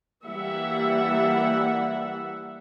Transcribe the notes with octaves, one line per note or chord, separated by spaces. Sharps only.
E3 G3 A#3 E5 F#5